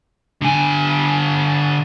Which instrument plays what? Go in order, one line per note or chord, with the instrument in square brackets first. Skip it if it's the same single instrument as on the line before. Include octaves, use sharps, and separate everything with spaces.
[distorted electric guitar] D3 G#5